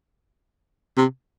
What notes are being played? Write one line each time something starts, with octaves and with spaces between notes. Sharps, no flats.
C3